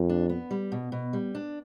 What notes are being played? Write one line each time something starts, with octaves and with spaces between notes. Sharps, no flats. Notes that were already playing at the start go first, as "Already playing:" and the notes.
Already playing: F2
D4
B3
G3
B2
B2
G3
D4